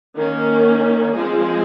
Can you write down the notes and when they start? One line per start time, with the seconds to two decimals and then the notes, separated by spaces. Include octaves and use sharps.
0.15 D#3 A#3 C#4
1.14 F3 G#3 C4 G#4